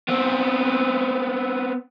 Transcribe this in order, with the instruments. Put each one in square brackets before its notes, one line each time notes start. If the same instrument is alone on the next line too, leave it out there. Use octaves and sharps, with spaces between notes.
[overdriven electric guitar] B3 C4